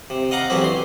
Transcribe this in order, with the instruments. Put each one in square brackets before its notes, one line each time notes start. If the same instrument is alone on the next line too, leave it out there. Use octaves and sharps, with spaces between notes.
[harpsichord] C3
D#5 F5 F#5 A#5
E2 D3 F#3 C4 G4
C6